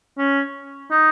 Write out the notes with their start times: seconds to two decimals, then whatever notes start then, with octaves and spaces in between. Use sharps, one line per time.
0.18 C#4
0.91 D#4